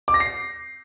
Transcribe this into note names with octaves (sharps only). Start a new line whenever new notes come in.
D6
A#6
C7